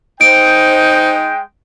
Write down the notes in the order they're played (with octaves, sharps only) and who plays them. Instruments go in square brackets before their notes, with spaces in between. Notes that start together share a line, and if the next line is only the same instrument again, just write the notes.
[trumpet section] G#3 G5 [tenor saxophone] D#4 [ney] C5 [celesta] D7